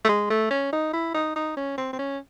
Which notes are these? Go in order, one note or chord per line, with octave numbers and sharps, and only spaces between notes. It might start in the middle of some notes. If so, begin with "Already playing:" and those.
A3
G#3
A3
C#4
D#4
E4
D#4
D#4
C#4
C4
C4
C#4